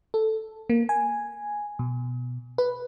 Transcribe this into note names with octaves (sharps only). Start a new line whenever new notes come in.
A4
A#3
G#5
B2
B4